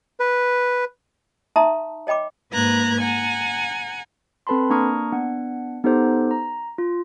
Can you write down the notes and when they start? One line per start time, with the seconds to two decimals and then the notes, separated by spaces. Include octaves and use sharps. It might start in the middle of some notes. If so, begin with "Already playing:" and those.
0.20 B4
1.56 D#4 E5 A5 A#5 C6 D#6
2.07 C#5 D#5 G5 B5 D6
2.51 G#2 A#3 B4 A#5 F#6 G#6
3.00 F#5 G#5 A#5
4.47 C4 A4 B4 A5 B5 C6
4.70 A#3 D4 A#5 C#6 D#6 F6
5.12 B3 D4 F#5
5.84 B3 D#4 G4 A4 C5
6.31 A#5
6.78 F4